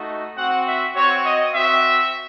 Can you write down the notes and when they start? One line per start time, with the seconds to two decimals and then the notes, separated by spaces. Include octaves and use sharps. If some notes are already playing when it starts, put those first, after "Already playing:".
Already playing: A3 D#4 F#4
0.38 C4 F#4 F#5
0.67 E5
0.96 C4 F#4 C#5
1.24 D#5
1.54 C4 F#4 E5